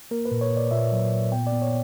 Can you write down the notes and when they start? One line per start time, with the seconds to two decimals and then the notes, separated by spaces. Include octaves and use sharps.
0.11 A#3 A#4
0.25 B4
0.31 A#2
0.41 C#5
0.51 A#2
0.57 D5
0.71 A#2 E5
0.92 F#3
1.12 A#2
1.32 B3 G5
1.47 D5
1.52 B3
1.62 C#5